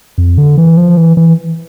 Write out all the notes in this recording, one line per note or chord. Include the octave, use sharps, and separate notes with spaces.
F2
D3
E3
F3
E3
E3